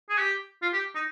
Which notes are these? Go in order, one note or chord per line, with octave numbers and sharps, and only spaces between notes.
G#4
G4
F4
G4
D#4